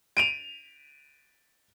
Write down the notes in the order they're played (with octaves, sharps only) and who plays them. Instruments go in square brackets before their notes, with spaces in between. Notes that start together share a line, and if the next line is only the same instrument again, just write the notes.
[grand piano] D7 D#7 F7